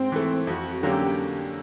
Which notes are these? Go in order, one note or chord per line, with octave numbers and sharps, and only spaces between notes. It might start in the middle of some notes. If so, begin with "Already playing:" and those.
Already playing: G#2 C4
E3 A3
F2 F#4
D3 F#3 A#3 C#4 G4